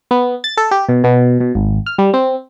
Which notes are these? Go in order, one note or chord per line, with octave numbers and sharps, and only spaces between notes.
B3
A6
A4
G4
B2
B2
B2
G#1
F6
G3
C4